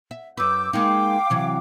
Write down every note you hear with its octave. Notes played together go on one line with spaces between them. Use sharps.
E5
F#2 B4 D6 E6 G6
G#3 A#3 D#4 F5 G5 D6
C3 E3 F#3